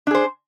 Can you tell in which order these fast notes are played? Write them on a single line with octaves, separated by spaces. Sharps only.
D4 G#4 C5